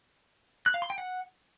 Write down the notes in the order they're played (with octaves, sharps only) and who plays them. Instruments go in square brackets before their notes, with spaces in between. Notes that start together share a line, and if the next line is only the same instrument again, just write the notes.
[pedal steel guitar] F#6
F5
C6
G5
F#5